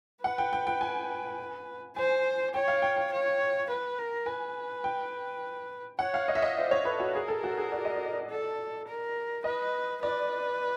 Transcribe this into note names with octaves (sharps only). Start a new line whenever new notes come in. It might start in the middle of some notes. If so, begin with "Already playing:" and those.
B4 F#5
G5
G5
G5
G#5
C5 G#5
C#5 G5
F5
G5
G5
C#5
B4
A#4
B4 G#5
G5
C#5 F#5
F5
D#5
E5
D#5
C5 D5
C#5
A4 B4
F#4
G#4 A#4
A4
F#4
G#4
D5
D#5
D5
A4
A#4
B4 D#5
B4 D5